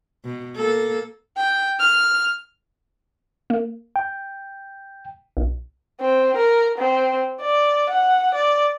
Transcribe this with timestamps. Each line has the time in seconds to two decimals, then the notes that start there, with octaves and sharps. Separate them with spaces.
0.24 B2
0.56 A#3 A4
1.37 G5
1.80 F6
3.50 A#3
3.96 G5
5.37 B1
6.01 C4
6.37 A#4
6.78 C4
7.41 D5
7.90 F#5
8.34 D5